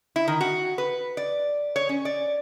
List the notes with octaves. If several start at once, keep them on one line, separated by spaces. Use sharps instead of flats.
E4
D#3
F#4
B4
D5
C#5
C#4
D5